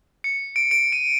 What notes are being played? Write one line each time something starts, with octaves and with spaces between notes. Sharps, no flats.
C#7
D7
D7
D#7